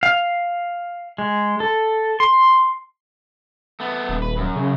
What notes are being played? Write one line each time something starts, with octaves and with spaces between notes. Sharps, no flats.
F5
G#3
A4
C6
A3 B3
D#1
B4
F#2
C#3